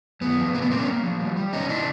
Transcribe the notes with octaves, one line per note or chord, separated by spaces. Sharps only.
F#2 B3
F3
A#2 A#3
B3
G3 A#3 C4
B3 C#4
A#3
F3
G3
G3
E2 C#4 D#4
C#3 D4 E4